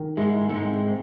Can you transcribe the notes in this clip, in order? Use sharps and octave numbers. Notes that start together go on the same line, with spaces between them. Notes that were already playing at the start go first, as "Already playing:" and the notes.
Already playing: D#3
G#2 G#3 E4
D#3
A3
G#2 G#3
C4